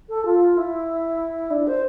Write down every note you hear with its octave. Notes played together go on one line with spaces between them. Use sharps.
A4
F4
E4
D4
C5